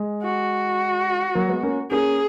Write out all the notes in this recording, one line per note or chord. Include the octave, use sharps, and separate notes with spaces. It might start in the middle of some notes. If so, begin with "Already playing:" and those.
Already playing: G#3
F#4
F#3 A#3
G#3 B3
A#3 C#4
A#3 C#4 G#4